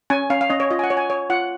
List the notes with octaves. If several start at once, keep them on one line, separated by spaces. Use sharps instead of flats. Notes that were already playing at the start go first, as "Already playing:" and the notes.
C#4 G#5
C#4 F5
F5
C#4 D#5
C#5
F4 D#5
G#5
F#5
C#5
G#5
C#5
F4 F#5